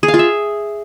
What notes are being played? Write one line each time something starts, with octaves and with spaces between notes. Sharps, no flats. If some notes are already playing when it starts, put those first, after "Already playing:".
G#4
F5
F4
E5